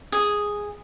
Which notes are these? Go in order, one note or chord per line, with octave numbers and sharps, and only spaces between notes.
G#4